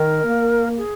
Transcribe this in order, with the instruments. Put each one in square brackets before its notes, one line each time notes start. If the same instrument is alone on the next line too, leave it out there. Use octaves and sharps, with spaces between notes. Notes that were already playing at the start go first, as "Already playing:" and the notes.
Already playing: [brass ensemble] D#3 [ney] A#4
[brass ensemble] A#3
[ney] G#4